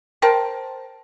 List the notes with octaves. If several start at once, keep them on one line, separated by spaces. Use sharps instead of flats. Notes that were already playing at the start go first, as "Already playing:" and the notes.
A#4 C5 G5 A5